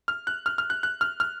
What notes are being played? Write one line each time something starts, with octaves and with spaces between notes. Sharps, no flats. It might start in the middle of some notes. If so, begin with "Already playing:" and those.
F6
F#6
F6
F6
F#6
F#6
F6
F6